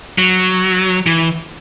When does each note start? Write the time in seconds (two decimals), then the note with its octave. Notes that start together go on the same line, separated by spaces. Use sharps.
0.18 F#3
1.07 E3